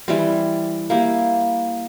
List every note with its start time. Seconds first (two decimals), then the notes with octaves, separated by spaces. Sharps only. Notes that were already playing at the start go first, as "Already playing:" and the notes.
0.08 E3 G3 C4
0.90 A#3 E4 G4